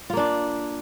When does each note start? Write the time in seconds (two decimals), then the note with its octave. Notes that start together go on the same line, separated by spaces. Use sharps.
0.10 F4
0.13 A#3
0.17 D4